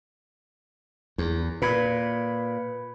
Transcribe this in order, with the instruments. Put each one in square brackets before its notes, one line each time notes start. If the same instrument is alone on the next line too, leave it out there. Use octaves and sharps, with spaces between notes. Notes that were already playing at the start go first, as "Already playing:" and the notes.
[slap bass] E2
[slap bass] A#2 [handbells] B4 B5 G#6